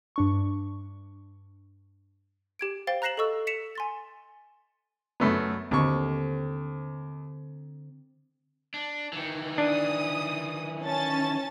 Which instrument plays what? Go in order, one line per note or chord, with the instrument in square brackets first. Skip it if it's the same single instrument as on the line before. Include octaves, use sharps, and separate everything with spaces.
[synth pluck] G2 D4 C#6
[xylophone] G4 G#6 D7
C5 F5 G5 A6 G7
A#5 F#6 A#6 C7 E7 F#7
A4 D#5 C#6 E6
B6 C#7 E7 F7
G#5 C6 A6
[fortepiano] F#2 A3 B3
[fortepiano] D#2 C#6 [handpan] D3 C4
[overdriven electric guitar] D4
D#3 E3
[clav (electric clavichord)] D4 [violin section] D#6
[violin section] C#4 A5 A6